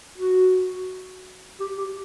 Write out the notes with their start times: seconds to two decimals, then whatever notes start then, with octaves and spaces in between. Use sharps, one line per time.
0.18 F#4
1.60 G4
1.78 G4